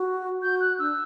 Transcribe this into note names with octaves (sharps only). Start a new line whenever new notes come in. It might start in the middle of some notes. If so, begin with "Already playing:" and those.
Already playing: F#4
F#4 G6
F#6
D4 E6